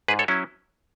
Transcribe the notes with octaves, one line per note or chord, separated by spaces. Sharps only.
G#2 G#4 B4
A4 C#5
F#3 C#4 E4